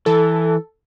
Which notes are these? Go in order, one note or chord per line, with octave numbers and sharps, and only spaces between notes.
E3 A4